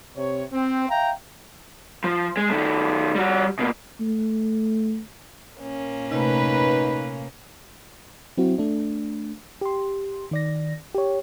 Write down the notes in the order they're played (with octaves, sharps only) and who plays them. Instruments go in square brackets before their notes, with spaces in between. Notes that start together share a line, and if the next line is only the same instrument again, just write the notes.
[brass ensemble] C3 C#5
C4
E5 F5 G5 A#5
[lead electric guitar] F3
G#3
D#3 A3
G3 F#4
B2 A#3
[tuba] A3
[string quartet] A#2 A#3 C#4
[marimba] C3 A3 [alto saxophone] D#4 [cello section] B4
[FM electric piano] F#3 C4 E4 F#4
A3 D4
G4 C6
D#3 D5 A#6
G4 C#5